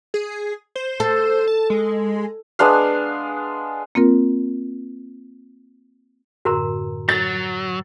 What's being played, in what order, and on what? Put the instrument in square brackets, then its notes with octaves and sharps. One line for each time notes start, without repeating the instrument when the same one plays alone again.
[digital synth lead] G#4
C5
[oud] A4
[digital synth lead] A5
G#3
[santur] G#3 B3 D4 F5
[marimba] A#3 C4 F4 A#4
[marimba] F#2 A2 D3 [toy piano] F#4 A#4 A#5
[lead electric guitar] F#3 [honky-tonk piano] A6